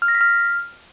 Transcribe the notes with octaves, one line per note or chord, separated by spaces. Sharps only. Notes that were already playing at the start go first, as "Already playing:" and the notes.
F6
A#6
B6
F6